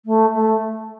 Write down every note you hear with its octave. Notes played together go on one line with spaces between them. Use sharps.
A3
A3